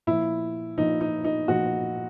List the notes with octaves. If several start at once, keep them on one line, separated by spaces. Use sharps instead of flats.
A#2 F3 E4
A#2 F3 D#4
D#4
D#4
A#2 F3 F#4